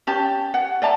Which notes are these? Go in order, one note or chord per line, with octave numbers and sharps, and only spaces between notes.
C#4 G4 A5
F#5
D5 E5 A5 A#5